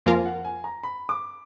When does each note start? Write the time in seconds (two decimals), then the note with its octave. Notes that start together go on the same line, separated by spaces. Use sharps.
0.06 F2 F3 A#3 F4 A#4 G#5
0.26 F#5
0.45 G#5
0.64 A#5
0.83 B5
1.09 D6